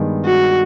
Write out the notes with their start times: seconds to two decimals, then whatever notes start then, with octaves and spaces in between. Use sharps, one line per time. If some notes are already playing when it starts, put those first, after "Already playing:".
Already playing: G2 D#3 G#3 B3
0.25 F#4